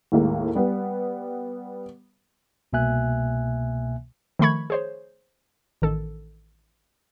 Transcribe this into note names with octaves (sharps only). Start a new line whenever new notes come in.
D#2 A2 G#3 A#3
G3 B3
C2 B2 A#3 E5 G#5 F#6
D#3 F3 A3 B5 C#6 G#6
G#4 C5 C#5
A1 D#3 A4